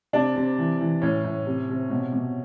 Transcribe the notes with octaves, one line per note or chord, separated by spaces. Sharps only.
C3 D4
C3
E3
E3
A2 C#4
A2
C3
C3
B2
B2